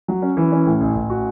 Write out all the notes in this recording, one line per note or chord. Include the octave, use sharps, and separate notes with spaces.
F#3
C#4
E3
C#4
A2
A1
A1
F#4